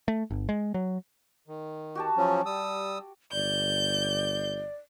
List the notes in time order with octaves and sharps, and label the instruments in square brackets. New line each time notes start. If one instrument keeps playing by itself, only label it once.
[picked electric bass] A3
G1
G#3
F#3
[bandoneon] D#3
[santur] F#4 G4 A5
[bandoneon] F3 F#3 C#4
G3 D#6 E6
[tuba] G1 [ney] D5 [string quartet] G6